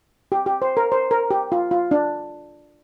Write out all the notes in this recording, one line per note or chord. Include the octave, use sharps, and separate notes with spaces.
G4
G4
C5
A#4
C5
A#4
G4
F4
F4
D4